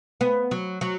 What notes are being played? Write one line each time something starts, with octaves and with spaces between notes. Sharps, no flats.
B3
F#3
F#3